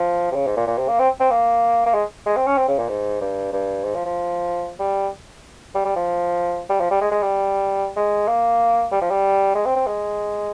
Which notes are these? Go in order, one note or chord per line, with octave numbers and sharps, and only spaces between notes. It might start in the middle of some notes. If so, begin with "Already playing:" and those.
Already playing: F3
C3
C#3
G#2
A#2
A#2
C3
A#3
C4
C4
A#3
A#3
G#3
G#3
C4
C#4
C4
C#3
A#2
G#2
G2
G2
G#2
F3
F3
G3
G3
G3
F3
G3
F3
G3
G#3
G#3
G3
G#3
A#3
G3
F3
G3
G#3
C4
C4
G#3